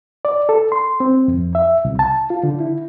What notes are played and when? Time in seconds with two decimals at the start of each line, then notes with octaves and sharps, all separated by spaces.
0.25 D5
0.49 A4
0.72 C6
1.00 C4
1.28 F2
1.55 E5
1.85 C2
1.99 A5
2.30 F4
2.43 D3
2.60 E4